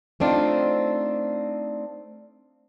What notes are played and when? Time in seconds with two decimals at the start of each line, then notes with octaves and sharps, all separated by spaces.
0.20 A3 C4 D4 D#4 F4